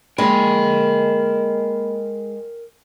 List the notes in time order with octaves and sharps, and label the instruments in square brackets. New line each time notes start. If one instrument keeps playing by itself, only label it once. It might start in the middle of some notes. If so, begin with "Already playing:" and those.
[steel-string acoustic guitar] G#3 [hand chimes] A#3 B5 [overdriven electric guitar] A#4 G5